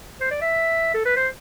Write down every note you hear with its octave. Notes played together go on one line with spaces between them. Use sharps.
C5
D5
E5
A4
B4
C5